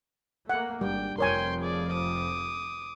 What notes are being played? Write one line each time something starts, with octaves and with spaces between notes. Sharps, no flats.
A3 A#3 F#5
G#1 G3 D4 G5
F1 F2 F3 A#4 C#5 G5 G#5 C6
G#4 D5
D6 D#6